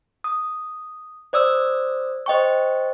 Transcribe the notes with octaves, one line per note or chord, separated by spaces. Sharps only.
D#6
C5 D5 D#6 E6
C5 D#5 G5 C#6